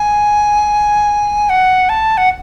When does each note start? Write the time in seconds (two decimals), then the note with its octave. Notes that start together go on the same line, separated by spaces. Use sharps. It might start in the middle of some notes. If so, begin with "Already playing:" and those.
Already playing: G#5
1.50 F#5
1.89 A5
2.17 F#5